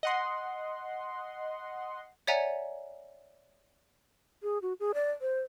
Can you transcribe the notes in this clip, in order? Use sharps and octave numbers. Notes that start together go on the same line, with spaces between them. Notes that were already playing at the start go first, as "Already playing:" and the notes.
D#5 F#5 C6
C#5 D5 E5 F#5 G#5 A#5
G#4
F#4
G#4
D5
C5